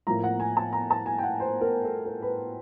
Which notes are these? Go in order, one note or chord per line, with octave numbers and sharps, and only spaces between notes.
A2 F3 A#3 A#5
F#5
G#5
A5
A#5
A5
G#5
G5
F#5
C5
A#4
A4
A#4
B4